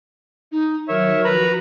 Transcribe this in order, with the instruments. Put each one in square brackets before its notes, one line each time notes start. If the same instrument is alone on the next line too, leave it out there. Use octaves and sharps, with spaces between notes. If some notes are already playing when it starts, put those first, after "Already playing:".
[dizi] D#4
[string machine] D#3 F#3 [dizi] A#4 [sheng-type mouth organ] C#5 E5
[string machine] F3 F#4 [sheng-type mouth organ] B4 A#5 B5